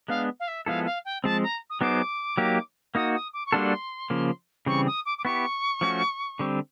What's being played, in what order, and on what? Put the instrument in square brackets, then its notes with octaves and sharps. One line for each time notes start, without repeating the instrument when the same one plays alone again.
[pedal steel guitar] G#3 B3 D4 [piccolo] F5
[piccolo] F5
E5
[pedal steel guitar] F3 G#3 B3 E4 A4 [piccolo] F5
[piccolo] F5
G5
[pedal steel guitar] F3 G#3 C4 [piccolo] A5
[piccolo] A#5
D#6
[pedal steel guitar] F#3 B3 D#4 G#4 C5 [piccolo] D6
[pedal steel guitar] F#3 A#3 D#4 G4
[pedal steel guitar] A#3 D#4 F#4 [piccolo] D#6
[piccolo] D#6
D6
C#6
[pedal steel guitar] G3 A#3 D4 F#4 A4 [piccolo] C6
[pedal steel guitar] C#3 F3 A#3
[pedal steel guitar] C#3 E3 G3 C4 [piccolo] C#6
[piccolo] D#6
D6
D6
[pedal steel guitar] B3 E4 G4 [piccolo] C#6
[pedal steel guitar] F3 A3 C#4 F#4
D3 G3 C4